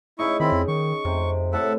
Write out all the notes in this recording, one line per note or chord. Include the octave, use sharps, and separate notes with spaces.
C#3 D#4 E4 D#5 C#6
D#3 C4 E4 B5
F2
D#3 C#6
F2 C3
A2 A4 E5 F#5